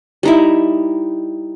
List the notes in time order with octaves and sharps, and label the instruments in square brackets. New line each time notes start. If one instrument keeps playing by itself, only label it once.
[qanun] G3 D#4 E4